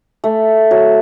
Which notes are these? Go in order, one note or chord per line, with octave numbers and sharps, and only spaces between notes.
A3
F#3